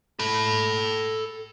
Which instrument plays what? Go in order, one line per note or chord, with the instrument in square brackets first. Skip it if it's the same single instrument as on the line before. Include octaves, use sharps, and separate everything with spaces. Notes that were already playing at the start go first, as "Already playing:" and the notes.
[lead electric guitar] A4 B5